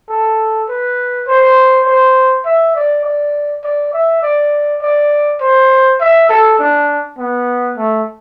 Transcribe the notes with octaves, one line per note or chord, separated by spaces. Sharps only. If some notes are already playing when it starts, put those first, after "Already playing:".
A4
B4
C5
C5
E5
D5
D5
D5
E5
D5
D5
C5
E5
A4
D4
B3
A3